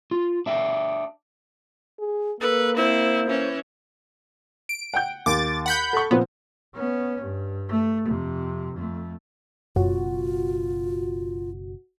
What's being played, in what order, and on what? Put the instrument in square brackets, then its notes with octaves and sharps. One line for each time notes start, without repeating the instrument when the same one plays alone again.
[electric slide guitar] F4
D4 E5 G5
[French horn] G#4
[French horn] A#3 [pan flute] A4 [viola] B4
[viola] C4 E4 [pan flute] C5
[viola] E3 C#4
[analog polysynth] D7
[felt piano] F#5 G5 G6
[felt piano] D#2 [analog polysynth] D6 A6
[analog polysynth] F#5 B5 G6
[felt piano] A4 C#6
[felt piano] A#2 F3 C4 [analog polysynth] B3
[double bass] B3 C#4
G2
A3
F2 C3
F2 A3
[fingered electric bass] F#1 B2 [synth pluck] F#2 [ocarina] F4 [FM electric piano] F#4